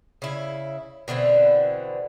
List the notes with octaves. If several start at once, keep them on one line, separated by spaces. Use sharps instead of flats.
C#3 E4
B2 D3 E3 C4